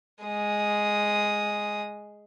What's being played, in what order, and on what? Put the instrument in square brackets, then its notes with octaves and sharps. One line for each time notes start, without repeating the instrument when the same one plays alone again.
[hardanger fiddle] G#3 D#6